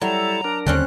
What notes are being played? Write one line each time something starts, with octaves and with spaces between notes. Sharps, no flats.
F#3 G3 E4 A4 A#5
D4 A#4
D#2 D3 G3 C4 C#4 F#6